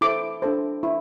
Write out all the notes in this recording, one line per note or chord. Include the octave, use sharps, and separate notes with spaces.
E4 A4 C5 D6
D4 A4 C5
E4